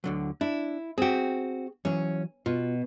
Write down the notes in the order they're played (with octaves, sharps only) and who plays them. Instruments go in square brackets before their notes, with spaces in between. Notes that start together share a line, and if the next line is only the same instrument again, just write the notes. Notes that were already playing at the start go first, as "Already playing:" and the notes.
[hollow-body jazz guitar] D2 D3 F#3
[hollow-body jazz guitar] D4 [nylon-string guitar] E4
[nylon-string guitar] C4 F#4 [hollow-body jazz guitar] G#4 G5
[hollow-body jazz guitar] E3 F#3 [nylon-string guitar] C#4
[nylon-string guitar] B2 [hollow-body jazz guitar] F4